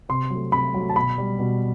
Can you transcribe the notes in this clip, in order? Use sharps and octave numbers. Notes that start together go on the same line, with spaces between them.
C3 C6
F#3
A3
C3 B5
F#3 A3
A5
B2 B5
G3
B2